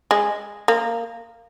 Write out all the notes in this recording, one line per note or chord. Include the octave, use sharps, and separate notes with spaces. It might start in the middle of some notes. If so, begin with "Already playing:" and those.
G#3
A#3